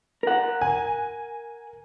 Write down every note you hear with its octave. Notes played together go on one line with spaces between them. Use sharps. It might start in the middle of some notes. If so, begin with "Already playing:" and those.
A#4 F#5
G#5